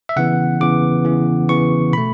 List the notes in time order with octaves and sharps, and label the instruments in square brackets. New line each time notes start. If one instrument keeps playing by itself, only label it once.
[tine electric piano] E5
C#3 E3 B3 F#5
C#3 E3 B3 D6
C#3 E3 B3
C#3 E3 B3 C#6
B2 A3 B5